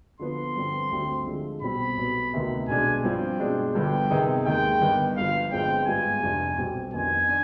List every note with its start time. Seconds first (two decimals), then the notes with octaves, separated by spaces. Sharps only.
0.20 D3 F3 B3 C6
0.56 G2 D3 F3 C4
0.91 D2 D3 G3 C4
1.26 D3 F3 G#3
1.61 B1 B2 G3 C4 B5
1.97 B1 B2 B3
2.33 D2 C3 D#3 B3
2.68 B1 B2 G#3 D4 G#5
3.04 G2 F3 C4 F4 G5
3.39 B2 G#3 D4
3.74 G1 G2 D3 F3 B3 G5
4.09 C3 D#3 B3 D#4 G#4
4.46 D#2 D#3 G#3 G5
4.80 G1 G2 D#3 B3
5.16 G1 G2 F3 F5
5.51 G1 G2 F3 G#3 C4 G5
5.87 G#2 G3 B3 F4 G#5
6.22 F2 C3 F3 B3 D4
6.58 B1 B2 G3 C4 G4
6.93 F2 D#3 B3 D4 G#5
7.29 D4